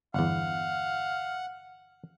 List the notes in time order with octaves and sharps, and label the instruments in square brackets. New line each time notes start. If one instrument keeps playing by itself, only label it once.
[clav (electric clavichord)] G1 E2 [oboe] F5 [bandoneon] F#5